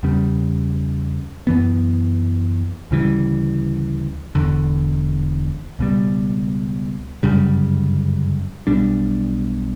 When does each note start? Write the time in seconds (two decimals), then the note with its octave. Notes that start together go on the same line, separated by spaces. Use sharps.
0.03 E2 C#3 G3
1.47 F#2 E3 B3
2.91 D2 C#3 E3 G3
4.35 E1 E2 D3
5.79 C#2 B2 G3
7.23 G1 F#2 C#3 G3
8.67 B1 B2 G3 D4